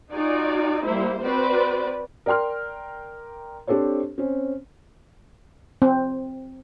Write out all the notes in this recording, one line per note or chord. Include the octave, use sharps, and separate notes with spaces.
D#4 F4 F#4 D5 G#5
G3 A#3 E4 C5
C4 F#4 B4 C5 D5
A#4 D5 G5 C6 F6
C4 D4 G4 A4 C5 C#5
C4 C#4
C4